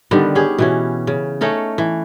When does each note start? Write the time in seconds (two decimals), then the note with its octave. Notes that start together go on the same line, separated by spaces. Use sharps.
0.11 D3 D#3 G3 B3
0.35 C#4 G4 G#4
0.58 B2 E3 C#4
1.07 C#3
1.41 A3 C#4 D#4 A4
1.78 E3